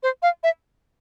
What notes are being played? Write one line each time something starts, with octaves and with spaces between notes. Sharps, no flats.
C5
F5
E5